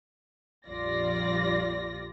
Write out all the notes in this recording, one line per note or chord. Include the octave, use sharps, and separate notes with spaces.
A#1 F2 G3 F4 D5 A#6